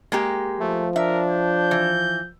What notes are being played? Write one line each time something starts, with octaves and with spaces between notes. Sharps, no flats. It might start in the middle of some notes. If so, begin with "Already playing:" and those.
G#3 A#3 G4
F3 A3
D4 A#4 E5
G6
E3